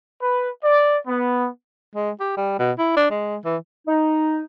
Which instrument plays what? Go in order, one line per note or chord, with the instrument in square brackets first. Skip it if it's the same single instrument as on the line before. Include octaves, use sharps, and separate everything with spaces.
[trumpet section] B4
D5
B3
[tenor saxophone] G#3
G4
G3
B2
E4
D4
G#3
E3
[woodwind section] D#4